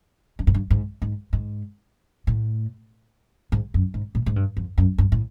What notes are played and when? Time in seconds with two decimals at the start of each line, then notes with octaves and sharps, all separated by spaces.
0.39 G2
0.47 G#2
0.54 G2
0.70 G#2
1.02 G#2
1.33 G#2
2.27 A2
3.52 G#2
3.74 F#2
3.94 G#2
4.15 A2
4.26 G#2
4.36 G2
4.57 F2
4.78 F#2
4.98 G2
5.12 A2